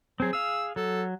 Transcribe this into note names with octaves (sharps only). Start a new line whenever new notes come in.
F#3 C4 G#4
G#4 F5 E6
F#3 A4